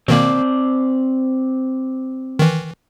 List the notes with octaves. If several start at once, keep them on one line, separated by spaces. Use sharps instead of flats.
B2 D#3 A#3 C4 D5
D#3 E3